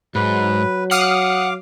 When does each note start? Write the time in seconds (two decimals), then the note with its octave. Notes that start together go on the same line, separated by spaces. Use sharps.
0.15 G#2 F#3 B4
0.91 F5 F#5 D6 D#6 F6 C7